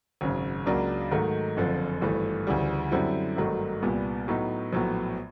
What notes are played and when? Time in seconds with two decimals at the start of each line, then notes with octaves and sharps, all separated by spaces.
0.21 G#1 F#2 C#3
0.66 C#2 C#3 F#3 A#3 D4
1.11 G#2 D#3 F#3 A3
1.57 F#1 F2 D3 F3
2.01 G#1 G2 E3 A3
2.47 D2 C#3 E3 G3
2.92 F#2 D3 G3 C4 E4
3.37 G#1 G2 D#3 F#3 A3
3.82 C2 A#2 G3 B3
4.28 A2 F#3 B3 D#4
4.73 A#1 A2 F#3 B3